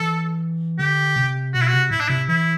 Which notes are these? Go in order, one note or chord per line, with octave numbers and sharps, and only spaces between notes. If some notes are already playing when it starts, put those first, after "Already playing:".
Already playing: E3 A4
D3 G4
C3
B2 F#4
E4
F#4
C3
A2 E4
D4
C3 E4
E3 E4